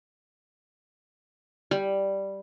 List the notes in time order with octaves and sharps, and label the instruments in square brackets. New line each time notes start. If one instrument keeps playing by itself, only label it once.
[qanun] G3